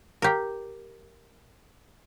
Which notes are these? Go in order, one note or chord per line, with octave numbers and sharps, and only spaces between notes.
G4 A#4